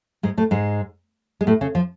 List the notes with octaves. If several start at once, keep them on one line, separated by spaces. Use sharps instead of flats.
G#2 G#3
A2 A3
G#2 G#3
G#3
A2 A3
C#3 C#4
F3 F4